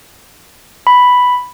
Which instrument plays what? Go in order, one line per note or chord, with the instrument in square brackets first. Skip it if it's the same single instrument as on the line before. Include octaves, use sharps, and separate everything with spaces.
[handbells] B5